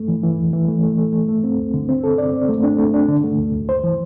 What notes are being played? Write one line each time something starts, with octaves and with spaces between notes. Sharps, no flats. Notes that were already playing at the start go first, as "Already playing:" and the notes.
Already playing: A3
E3
E3
E2
E3
A3
A3
A3
A3
A3
C4
D2
D3
C4
A4
D5
C4
A3
D4
A3
D4
D3
A3
D2
D2
C5
E3